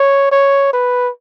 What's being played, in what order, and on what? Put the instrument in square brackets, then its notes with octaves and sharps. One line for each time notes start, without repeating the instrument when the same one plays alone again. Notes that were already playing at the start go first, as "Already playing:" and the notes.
Already playing: [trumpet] C#5
C#5
B4